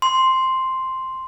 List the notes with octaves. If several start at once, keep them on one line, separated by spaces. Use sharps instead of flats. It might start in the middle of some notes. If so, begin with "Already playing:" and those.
C6